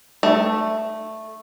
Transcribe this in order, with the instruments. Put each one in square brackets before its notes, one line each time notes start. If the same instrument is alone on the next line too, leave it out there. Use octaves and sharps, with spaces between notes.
[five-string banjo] A3